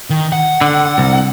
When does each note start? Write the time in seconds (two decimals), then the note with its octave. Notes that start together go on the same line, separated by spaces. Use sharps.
0.10 D#3
0.32 F#5
0.61 D3
0.98 C2